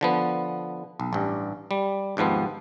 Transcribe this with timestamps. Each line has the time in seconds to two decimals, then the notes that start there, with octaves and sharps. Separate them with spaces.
0.01 D3 F3 B3
1.00 B1
1.13 A1 G2
1.71 G3
2.17 D#2 G#2 F3 B3 C4